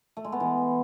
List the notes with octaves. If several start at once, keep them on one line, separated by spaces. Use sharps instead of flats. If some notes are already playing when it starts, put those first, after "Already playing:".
A3
G#3
B3
E3